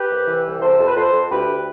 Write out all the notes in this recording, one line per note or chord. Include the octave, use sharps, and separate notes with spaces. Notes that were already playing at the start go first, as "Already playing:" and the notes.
Already playing: G4 B4
C2
E3
C2
C3 A4 C5
F2 A4
B4
F2 A4 C5
F2
D2 G4 B4
D2